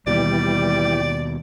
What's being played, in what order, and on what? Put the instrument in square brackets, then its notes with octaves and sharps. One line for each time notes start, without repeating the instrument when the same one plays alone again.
[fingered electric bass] D#2 B2 [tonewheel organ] E3 G4 [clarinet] G3 [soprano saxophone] D5